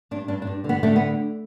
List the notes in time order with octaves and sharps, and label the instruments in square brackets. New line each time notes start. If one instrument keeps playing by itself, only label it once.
[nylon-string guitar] G2 D4
G2 D4
D4
G2
D3
B3
D3 A3
B3